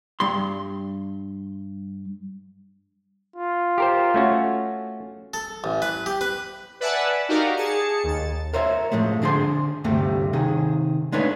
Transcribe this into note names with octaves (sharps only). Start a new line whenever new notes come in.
G2 C6
F4
G4 A#4 C5
A3 C#4 F#4
A4
A1
B4
G4
B4
B4 D5 E5 F#5 G#5 A5
D#4 F#4 G4 A#4 D5 F5
G#4 A5 C#7
D#2 A6
A#4 C5 C#5 E5
A2 F3 G#3 A3
D3 D4 G#4 C5 C6
D2 G2 C3 G3 A3
C3 D#3 G#4
G#3 A3 D4 D#4 B4 C#5